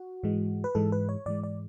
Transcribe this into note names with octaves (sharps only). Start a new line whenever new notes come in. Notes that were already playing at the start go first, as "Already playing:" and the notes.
Already playing: F#4
G#2 E3 G#3
B4
G#2 E3 G#3 A4
B4
C#5
G#2 E3 G#3 D5
D5